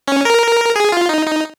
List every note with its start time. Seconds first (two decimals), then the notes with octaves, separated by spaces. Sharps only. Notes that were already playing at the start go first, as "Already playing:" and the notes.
0.08 C#4
0.25 A#4
0.76 G#4
0.92 F4
1.09 D#4
1.27 D#4